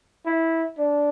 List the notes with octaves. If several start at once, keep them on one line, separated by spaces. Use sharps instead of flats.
E4
D4